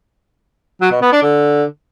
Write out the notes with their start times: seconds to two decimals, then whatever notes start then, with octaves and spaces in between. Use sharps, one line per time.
0.81 F#3
0.92 B2
1.02 B3
1.12 D4
1.22 D3